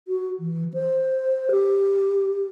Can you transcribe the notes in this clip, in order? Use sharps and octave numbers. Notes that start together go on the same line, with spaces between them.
F#4
E3
C5
G4